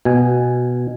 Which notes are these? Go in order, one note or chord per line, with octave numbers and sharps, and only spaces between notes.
B2 G#5